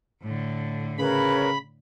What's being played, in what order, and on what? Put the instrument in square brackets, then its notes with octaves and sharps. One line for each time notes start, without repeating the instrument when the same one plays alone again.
[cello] A2 D3
[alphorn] C#3 [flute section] A#4 B4 C#5 [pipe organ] B5